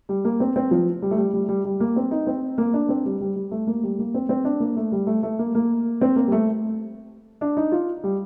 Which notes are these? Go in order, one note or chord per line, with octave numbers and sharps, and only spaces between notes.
G3
A#3
C4
C4
F3
G3
A3
G3
G3
G3
G3
A#3
C4
D#4
C4
A#3
D4
C4
G3
G3
G3
A3
A#3
G3
A#3
C4
C4
D4
A#3
A3
G3
A3
A3
A#3
A#3
C4
A#3
G3
A3
D4
D#4
F4
G3